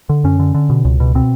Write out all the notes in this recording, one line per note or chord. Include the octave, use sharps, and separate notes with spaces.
D3
F#2 C#4
D3
D3
B2
C#2
B2
B2 C4